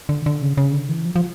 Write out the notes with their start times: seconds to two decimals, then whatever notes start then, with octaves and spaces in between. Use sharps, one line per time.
0.09 D3
0.26 D3
0.42 C#3
0.57 C#3
0.73 D3
0.89 E3
1.05 F3
1.16 F3